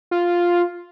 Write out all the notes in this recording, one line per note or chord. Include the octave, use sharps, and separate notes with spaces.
F4